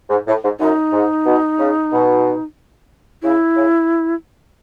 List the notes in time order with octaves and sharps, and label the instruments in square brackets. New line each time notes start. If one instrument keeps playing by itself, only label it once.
[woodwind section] G#2
A2
G#2
[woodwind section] F#2 [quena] D#4
[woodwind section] G#2
B2
C#3
B2
[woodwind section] C#3 [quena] E4
[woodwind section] C#3